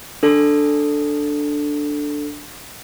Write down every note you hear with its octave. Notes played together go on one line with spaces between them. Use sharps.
D4 A4